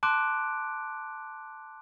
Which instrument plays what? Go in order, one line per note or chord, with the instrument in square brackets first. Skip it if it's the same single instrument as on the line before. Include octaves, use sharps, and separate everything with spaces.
[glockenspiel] A5 C6 D6 F#6 D7